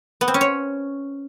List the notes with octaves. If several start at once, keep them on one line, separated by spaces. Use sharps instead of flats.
B3
C4
C#4
C#5